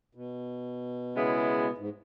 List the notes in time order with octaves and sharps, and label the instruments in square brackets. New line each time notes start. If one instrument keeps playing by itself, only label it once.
[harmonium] B2
[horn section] C#3 G#3 B3 E4
[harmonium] G#2